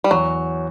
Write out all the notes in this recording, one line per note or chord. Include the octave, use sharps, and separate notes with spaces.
G3
E2 F#3